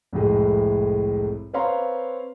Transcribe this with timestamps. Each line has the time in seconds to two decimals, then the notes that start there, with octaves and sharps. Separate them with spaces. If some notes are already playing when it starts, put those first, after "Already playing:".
0.13 C2 F2 A2 G#3
1.53 C4 B4 C#5 F5 A#5 C6